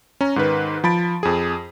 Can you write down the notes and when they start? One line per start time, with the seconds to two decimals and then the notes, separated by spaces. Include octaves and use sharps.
0.21 C#4 A#5
0.36 G#2 D#3 B4
0.84 F3 A5 B5 A6 D7
1.23 F2 G#4